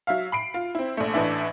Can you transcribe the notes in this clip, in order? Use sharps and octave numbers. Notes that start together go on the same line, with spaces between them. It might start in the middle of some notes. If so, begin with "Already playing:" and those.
F#3 E5 F5
B5 C7 D7
F4
C4 E4
A#1 A3
A1 A2 E3 D4 E5